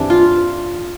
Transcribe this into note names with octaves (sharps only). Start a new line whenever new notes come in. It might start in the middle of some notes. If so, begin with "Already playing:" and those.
Already playing: G2 E3 G3 C4 D4
F4